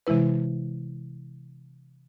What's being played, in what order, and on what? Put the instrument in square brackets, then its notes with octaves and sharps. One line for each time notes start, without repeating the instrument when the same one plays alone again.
[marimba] C3 E3 G#3 E4 B4